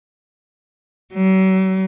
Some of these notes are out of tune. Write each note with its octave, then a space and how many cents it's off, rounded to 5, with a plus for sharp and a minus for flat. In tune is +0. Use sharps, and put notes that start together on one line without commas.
F#3 +40